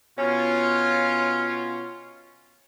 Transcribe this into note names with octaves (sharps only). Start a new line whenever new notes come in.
B2 C#4 F4